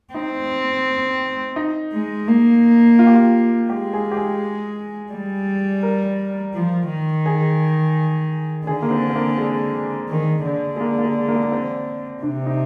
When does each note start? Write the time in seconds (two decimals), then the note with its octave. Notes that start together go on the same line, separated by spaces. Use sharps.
0.14 C4 D#4
1.56 D#4
1.92 G#3
2.27 A#3
2.99 F4
3.07 G4
3.15 F4
3.69 G#3 G4
3.93 G#4
4.11 G4
4.17 G#4
5.12 G3
5.83 A#4
6.54 F3
6.90 D#3
7.26 G#4
8.67 D3 G#4
8.82 A#3
8.91 C4
9.10 C4
9.15 A#3
9.38 G#3
10.09 D#3
10.45 D3
10.76 G#3
10.80 A#3
10.98 A#3
11.05 G#3
11.28 A#3
11.35 G#3
11.43 A#3
11.52 C4
12.23 C3 D4
12.46 D#4